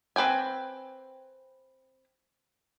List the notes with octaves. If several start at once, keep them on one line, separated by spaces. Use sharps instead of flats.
C4 B4 G5 G#5